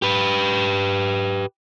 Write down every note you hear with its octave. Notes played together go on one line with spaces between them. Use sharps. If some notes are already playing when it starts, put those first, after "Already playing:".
G4 B4